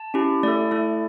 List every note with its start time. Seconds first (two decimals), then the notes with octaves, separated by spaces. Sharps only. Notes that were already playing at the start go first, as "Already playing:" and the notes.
Already playing: A5
0.14 C#4 E4 G4
0.43 A3 E4 A4 D5
0.71 A3 E4 A4